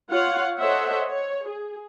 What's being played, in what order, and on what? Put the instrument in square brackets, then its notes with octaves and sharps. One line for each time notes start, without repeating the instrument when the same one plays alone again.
[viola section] F4 C#5 F5 F#5
A4 C5 C#5 D#5 E5 F#5
C#5
G#4